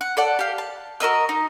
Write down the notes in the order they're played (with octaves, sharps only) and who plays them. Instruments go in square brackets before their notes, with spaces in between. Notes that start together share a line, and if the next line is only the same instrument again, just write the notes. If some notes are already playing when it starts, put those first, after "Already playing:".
[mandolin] F#5
A4 D5 F#5
G4 F5
A5
F#4 A#4 D#5 E6
D#4